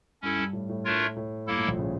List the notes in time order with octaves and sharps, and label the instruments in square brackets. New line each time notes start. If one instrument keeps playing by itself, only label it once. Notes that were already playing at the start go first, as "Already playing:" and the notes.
[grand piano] G2 [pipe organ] C#4 E4 A4
[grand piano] G2
A2
A2
[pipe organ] A3 D4 F4 A#4 C#5
[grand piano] A2
[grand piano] G2 [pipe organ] A#3 E4 A4
[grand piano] A2
A#1 A#2
C#3